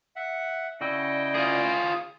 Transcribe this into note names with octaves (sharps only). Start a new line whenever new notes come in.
E5 F#5
C#3 E4 F#4 D5 D#5 G5 E6
F4 G#4